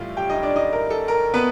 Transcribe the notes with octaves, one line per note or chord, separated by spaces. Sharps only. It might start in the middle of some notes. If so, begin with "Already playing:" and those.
Already playing: A2 E3 G3 E4 F4 F5
G4 G5
D#4 D#5
D4 D5
D#4 D#5
A#4
A4
A#4
B3 B4